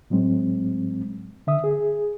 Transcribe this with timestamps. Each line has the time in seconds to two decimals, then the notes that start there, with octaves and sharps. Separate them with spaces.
0.10 A2 F#3 G#3 C4
1.47 D3 E5 D#6
1.64 G#4